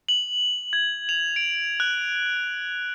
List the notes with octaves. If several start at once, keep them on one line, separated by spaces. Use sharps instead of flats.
F#7
G#6
F7
D7
F#6